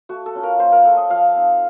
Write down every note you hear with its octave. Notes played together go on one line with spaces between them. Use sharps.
A3 F#4
A4
C#4 F4
A#4
A#3 C5
A#4
C#4 F4 A4
D#5
F3 F5
C4 D#4